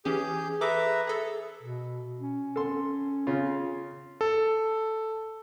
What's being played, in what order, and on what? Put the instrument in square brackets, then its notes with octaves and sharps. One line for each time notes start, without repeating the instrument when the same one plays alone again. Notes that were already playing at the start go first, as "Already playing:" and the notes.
[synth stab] E3 C#4 G4 [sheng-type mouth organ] G#4 G6
[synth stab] G#4 A4 D6 [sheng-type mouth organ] B4 E5 A#5
[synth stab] G#4 A4
[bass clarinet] B2
C#4
[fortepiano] A4 C6
C#3 F4
[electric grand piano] A4